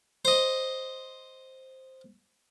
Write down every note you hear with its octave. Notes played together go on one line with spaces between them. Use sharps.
C5 D#5